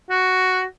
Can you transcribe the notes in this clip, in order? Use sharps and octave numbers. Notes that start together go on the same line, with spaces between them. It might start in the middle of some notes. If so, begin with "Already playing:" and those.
F#4